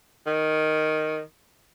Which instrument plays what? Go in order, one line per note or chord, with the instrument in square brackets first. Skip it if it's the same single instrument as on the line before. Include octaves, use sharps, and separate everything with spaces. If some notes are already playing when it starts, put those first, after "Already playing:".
[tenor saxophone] D#3